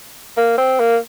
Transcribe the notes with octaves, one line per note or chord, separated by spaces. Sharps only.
A#3
C4
A#3